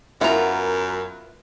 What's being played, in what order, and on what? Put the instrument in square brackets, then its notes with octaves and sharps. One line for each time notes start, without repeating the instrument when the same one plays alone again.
[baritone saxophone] F#2 [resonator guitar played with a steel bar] B3 F4 [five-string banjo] E4 [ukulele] A#4 A#5